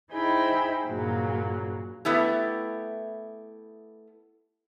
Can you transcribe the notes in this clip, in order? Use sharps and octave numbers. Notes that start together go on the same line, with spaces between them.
D#4 E4 G#4 C5 G5 B5
G2 A#2 C#3 F#3 A#3
A3 B3 E4 G4